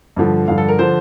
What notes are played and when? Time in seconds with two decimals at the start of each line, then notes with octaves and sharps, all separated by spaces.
0.17 G2 D3 F3
0.48 G2 D3 F3 F5
0.58 A4
0.68 A#4
0.79 D3 F3 C5